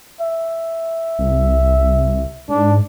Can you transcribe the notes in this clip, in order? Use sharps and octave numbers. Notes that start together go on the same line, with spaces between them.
E5
C2
G#2 D4